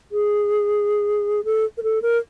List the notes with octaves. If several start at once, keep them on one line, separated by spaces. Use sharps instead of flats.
G#4
A4
A#4
A4
A#4